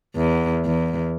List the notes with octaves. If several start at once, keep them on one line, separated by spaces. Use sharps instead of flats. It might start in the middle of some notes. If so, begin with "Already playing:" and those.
E2
E2